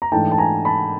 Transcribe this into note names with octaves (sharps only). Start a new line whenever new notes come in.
A#5
G#2 E3 A3 D4 G5 A5
A5
G#5 A#5
A5 B5